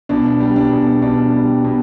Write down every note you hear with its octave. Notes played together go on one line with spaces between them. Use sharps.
B2 D4
G3
D4
B2
B2 D4
G3
B2